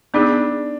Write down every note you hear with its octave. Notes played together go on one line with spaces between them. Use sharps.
B3 D4 D#4 G#4